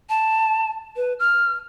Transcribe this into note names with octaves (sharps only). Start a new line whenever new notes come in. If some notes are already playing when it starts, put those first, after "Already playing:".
A5
B4
F6